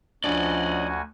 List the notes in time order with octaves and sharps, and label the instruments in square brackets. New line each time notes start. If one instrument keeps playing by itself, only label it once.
[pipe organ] D2 F#4 G#5 [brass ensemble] F3 C#4 [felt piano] D4 [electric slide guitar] D5 D#5